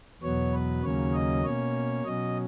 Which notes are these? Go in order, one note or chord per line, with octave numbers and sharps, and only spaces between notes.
E2 B2 F#3 B3 C#5
B4
D#2 C#3 F#3 A#3 C#4 C#5
D#5
B2 A#3 C#4 C#5
B2 F#3 C#4 D#5